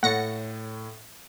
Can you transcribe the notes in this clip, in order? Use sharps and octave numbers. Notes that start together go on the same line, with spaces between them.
A2 C#5 F#5 A6 A#6 C#7